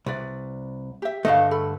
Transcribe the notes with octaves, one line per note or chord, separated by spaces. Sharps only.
C2 B4 D5
G4 E5
G2 D3 A3 D#5 F5
A4 B5